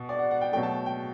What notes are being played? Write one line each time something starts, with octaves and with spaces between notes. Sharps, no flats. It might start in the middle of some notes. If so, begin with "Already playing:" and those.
Already playing: B2
D5
F#5
F#5
G5
B2 F#3 A3 G5
A5
G5